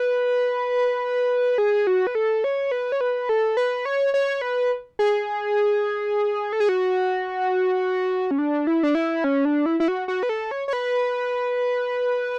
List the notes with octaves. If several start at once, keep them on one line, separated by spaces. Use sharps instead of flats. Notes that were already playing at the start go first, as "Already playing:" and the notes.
Already playing: B4
G#4
F#4
B4
A4
C#5
B4
C#5
B4
A4
B4
C#5
C#5
B4
G#4
A4
G#4
F#4
C#4
D4
E4
D4
E4
C#4
D4
E4
E4
F#4
F#4
B4
A4
C#5
C#5
B4